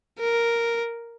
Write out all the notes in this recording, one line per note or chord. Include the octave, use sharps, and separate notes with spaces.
A#4